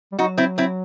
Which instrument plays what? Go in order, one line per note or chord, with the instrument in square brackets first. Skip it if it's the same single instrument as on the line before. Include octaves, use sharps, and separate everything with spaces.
[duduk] G3
[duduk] F#3 [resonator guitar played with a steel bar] D#4 F#4
[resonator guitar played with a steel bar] C4 E4
C4 E4